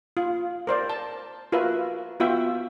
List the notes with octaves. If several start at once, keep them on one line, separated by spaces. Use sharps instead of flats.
F4
A#4 C5 D5
A5
F4 F#4 A#4 B4 E5
B3 F4 F#4 E5 G5